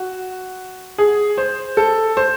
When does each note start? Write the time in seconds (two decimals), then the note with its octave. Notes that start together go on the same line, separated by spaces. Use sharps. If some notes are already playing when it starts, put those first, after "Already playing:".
Already playing: F#4
0.98 G#4
1.38 C5
1.77 A4
2.17 C5